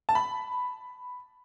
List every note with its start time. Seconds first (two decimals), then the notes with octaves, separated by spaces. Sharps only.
0.09 A5
0.15 B5